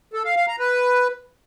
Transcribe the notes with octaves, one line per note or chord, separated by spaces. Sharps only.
A4
F5
F5
A#5
B4